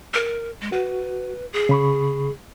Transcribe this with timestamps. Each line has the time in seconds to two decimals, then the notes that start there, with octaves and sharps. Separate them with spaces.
0.14 A#4
0.61 G#3
0.72 F#4 B4
1.53 G#4
1.69 C#3 B5 C#6